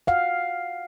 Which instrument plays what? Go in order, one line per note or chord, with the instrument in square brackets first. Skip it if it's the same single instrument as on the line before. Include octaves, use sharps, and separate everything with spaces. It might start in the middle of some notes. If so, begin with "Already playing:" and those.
[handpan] F5 F#5